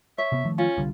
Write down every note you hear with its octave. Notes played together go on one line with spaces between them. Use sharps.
C#5 E5
C3 B3
D#3 F3 A3
C#4 F4
C2 D3 G3